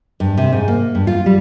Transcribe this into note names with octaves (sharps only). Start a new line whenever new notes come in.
G2
C3
G#2
A#3
G2
F4
G3